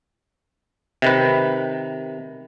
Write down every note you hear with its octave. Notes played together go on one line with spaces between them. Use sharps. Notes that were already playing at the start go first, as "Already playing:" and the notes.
C3 D#3 B4